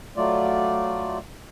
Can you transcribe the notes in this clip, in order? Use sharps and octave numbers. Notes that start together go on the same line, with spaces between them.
F#3 A3 F4 D5